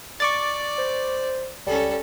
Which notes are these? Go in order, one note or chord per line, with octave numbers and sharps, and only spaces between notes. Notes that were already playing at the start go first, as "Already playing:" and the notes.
D5 C#6 D6 A6
C5
C#2 G3 C#4 A4